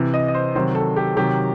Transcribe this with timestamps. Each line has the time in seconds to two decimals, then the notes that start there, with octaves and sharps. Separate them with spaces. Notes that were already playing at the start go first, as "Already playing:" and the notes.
Already playing: C3 E3
0.14 D#5
0.28 D#5
0.35 C5
0.55 C3 D#3 F#3 C5
0.75 A4
0.96 G4
1.16 C3 D#3 F#3 G4